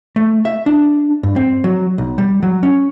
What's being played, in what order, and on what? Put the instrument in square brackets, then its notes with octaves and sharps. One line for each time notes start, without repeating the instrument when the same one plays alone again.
[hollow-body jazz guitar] A3
E5
D4
G2
C4
F#3
B1
G3
F#3
C#4